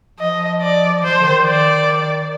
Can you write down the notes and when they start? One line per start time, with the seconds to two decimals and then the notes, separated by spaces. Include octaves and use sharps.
0.19 F3 D#5
0.62 D5
1.03 F3 C5
1.21 D3
1.25 D#3
1.46 D5